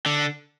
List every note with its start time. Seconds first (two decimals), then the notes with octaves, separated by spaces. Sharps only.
0.06 D3